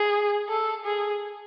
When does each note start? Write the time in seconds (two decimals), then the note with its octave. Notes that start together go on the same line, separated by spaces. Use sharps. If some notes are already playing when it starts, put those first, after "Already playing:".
Already playing: G#4
0.49 A4
0.85 G#4